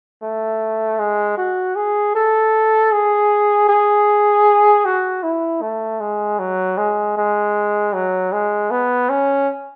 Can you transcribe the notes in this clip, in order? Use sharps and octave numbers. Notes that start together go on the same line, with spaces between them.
A3
G#3
F#4
G#4
A4
G#4
G#4
F#4
E4
A3
G#3
F#3
G#3
G#3
F#3
G#3
B3
C#4